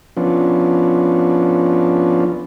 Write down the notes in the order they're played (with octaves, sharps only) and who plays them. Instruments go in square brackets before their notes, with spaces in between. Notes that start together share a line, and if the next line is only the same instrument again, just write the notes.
[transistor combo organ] F3 B3 C#4 D4 F4